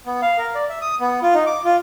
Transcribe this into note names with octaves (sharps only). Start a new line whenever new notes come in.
B3
F5
A#4
D5
E5
D#6
B3
F4
D#4
D6
F4